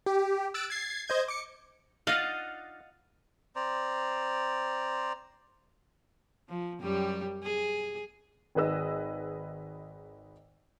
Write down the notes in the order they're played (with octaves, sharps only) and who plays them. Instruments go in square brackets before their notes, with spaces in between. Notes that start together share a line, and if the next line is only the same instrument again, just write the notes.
[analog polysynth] G4
E6 F#6 A6 D7
G#6 A6 C7
C5 D#5 G6 G#6
D6 C#7
[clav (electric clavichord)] D4 D#4 F4 [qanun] D#5 F#5 [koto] F5 [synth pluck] F6 A6
[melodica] C4 C5 D5 A#5
[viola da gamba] F3
F#2 G3 G4
G#4
[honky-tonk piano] G#1 D#3 G#4 B4 D#5 E6